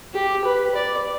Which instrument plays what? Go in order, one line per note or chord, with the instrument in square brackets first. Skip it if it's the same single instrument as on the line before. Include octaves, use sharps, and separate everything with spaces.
[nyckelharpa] G4
B4
D5